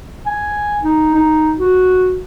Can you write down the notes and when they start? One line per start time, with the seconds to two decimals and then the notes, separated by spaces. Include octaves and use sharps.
0.27 G#5
0.83 D#4
1.15 D#4
1.60 F#4